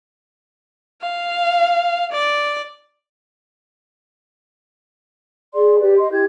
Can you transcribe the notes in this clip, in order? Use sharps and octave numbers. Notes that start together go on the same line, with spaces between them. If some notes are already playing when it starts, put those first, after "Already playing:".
F5
D5
G#4 D5 C6
G4 B4 D5
D#5 C6
E4 G4 G6 G#6